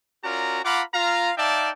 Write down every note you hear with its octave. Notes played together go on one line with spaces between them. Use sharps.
C#4 F4 F#4 A#4 D5 A#5
F4 F5 F#5 A#5 B5 D6
F4 F5 A#5
D#4 D5 E5 F5 G5 A5